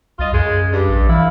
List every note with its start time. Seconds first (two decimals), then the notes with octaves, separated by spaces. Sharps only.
0.19 C2 F4 D#5
0.33 F#2 C#3 G#3 G#4
0.73 G2 D5
0.89 A#1
1.09 D3 E3 E4 F5